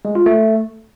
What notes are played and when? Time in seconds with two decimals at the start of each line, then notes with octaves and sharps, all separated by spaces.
0.05 G#3
0.15 F4
0.26 A3